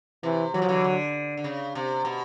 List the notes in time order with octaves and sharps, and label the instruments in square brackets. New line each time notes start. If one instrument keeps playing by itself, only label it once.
[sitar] C3 [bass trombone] E3
[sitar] E3 [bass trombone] F#3
[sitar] F3
D3 E3
D3
D3
C#3
C3
B2